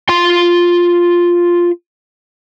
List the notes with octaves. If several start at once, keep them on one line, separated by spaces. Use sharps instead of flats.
F4 C6